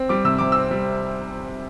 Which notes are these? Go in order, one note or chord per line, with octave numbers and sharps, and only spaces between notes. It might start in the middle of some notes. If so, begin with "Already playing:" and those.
Already playing: C4
G3 D6
C3 E6
C3 D6
C4 E6
G3